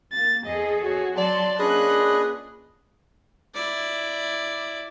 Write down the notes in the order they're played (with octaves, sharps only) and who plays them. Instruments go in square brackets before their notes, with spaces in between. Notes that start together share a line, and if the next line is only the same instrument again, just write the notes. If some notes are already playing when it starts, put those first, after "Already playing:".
[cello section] A#3 [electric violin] A6
[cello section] E2 G#4 A4 [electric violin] D#5
[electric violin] F#4 C#5
[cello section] F#3 [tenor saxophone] D5 [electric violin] A5 C6
[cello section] A#3 C#4 F4 [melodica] D4 B4 D#5 [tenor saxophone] G#4 [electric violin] F#6
[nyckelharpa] E4 D5